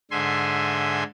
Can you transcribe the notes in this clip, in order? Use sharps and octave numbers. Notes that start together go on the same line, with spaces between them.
G#2 D3 E5 G#5 C6